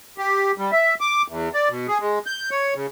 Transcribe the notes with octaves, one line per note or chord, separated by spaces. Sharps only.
G4
G3
E5
D6
E2
D5
B2
G#4
G#3
G6
C#5
C#3